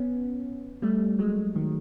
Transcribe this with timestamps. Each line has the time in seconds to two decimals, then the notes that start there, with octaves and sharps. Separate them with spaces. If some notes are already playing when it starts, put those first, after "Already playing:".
Already playing: B3 C#4
0.82 G3 A3
1.19 F#3 G#3
1.56 D#3